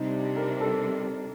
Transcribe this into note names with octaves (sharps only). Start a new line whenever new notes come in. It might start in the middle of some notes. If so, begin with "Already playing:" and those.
Already playing: C3 G3 D4 D#4
A#4
A4